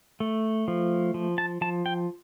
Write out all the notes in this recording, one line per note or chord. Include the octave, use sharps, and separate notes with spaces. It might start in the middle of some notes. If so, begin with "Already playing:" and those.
A3
F3
F3
A5
F3 A5
G5